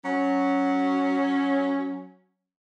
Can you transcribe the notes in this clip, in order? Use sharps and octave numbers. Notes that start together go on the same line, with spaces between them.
F#3 C#4